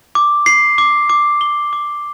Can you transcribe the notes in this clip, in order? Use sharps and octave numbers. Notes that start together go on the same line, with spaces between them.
D6
C7
D6
D6
G7
D6